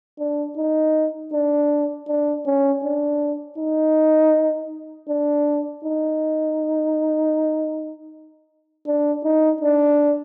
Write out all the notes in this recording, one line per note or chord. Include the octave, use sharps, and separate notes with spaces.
D4
D#4
D4
D4
C#4
D4
D#4
D4
D#4
D4
D#4
D4